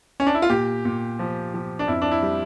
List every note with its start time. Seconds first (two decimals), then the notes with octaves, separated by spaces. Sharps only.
0.20 C#4
0.27 D4
0.35 E4
0.42 F4
0.50 A#2 G4
0.85 A#2
1.19 F3
1.54 F3
1.79 D4
1.88 F2 E4
2.02 D4
2.12 E4
2.23 G3